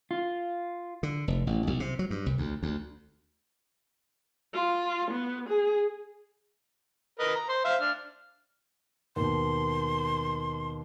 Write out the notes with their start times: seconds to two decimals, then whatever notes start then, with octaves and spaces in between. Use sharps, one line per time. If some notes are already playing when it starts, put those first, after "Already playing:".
0.11 F4
1.03 D3
1.28 F1
1.47 A1
1.67 B1
1.80 C3
1.99 F#3
2.10 G2
2.26 C2
2.38 D2
2.63 D2
4.54 F4
5.11 B3
5.49 G#4
7.19 A#4 B4 D#5
7.35 A#5
7.49 C5 C6
7.65 C5 E5 F5
7.81 D4 F6
9.16 D#2 B2 C6